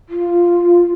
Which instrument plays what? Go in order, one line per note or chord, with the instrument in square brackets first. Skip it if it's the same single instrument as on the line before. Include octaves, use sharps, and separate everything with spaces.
[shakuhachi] F4